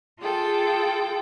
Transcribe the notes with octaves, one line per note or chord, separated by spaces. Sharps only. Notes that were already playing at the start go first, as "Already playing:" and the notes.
F4 G#4 A4 G5